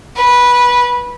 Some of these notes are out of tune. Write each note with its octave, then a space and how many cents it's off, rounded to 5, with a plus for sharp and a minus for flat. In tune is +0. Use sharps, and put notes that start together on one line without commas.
B4 -15